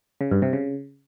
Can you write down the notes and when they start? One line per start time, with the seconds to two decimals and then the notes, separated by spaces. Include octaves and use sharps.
0.21 C#3
0.31 G2
0.42 C3
0.53 C#3